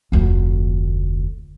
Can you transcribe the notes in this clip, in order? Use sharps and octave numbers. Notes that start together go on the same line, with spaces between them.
F1 D2